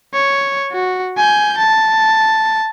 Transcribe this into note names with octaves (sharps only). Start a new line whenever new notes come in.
C#5
F#4
G#5 G6
A5